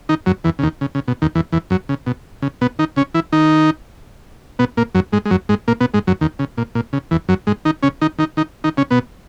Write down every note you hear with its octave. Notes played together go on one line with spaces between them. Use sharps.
D#3 D#4
F#2 F#3
E2 E3
C#3
D#2 D#3
C#3
C#3
B2
D#2 D#3
E2 E3
E2 E3
F#2 F#3
C#3
B2
C#3
B2 B3
D#3 D#4
C#3 C#4
E3 E4
D#3 D#4
B2 B3
A#2 A#3
F#2 F#3
G#2 G#3
G#3
F#2 F#3
G#2 G#3
A#2 A#3
B2 B3
G#2 G#3
F#2 F#3
D#2 D#3
C#3
A#2
A#2
C#3
E2 E3
F#2 F#3
G#2 G#3
D#3 D#4
C#3 C#4
D#3 D#4
D#3 D#4
D#3 D#4
D#3 D#4
C#3 C#4
B2 B3